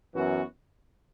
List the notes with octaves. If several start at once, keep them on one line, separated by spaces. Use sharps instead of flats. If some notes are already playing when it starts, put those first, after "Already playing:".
F#2 E3 B3 F#4